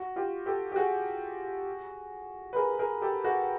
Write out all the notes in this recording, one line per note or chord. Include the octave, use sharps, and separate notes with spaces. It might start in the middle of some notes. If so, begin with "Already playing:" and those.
Already playing: F#4
F4 G4
G4 A4
G4
F#4 G#4
B4
G#4 A#4
G#4 A#4
G4 A4
F#4 G#4